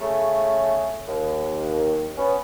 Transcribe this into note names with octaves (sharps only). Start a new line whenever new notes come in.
C#3 A3
D#2
B3 C#4